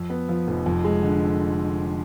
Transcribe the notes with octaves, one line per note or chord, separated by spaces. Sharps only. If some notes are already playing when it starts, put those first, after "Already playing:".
Already playing: F2
B3
F3
F1
F2
G#3
D3